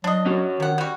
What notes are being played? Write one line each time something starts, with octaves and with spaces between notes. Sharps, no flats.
F#3 D4 D#5
C#4 F#4 C#5
C3 D#3 F#5
G3 F#4